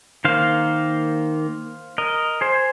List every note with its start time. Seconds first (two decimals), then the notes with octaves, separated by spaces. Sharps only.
0.25 D#3 A#3 C5 F5
1.98 A#4 D#5
2.41 G#4 C5